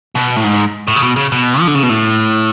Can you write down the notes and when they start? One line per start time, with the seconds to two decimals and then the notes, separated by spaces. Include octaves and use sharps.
0.15 B2
0.36 A2
0.44 G#2
0.88 A2
0.96 C#3
1.03 B2
1.16 C#3
1.32 B2
1.60 F3
1.67 D3
1.75 C#3
1.83 B2
1.89 A2